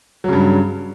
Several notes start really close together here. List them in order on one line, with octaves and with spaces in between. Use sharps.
F#3 C#3 G2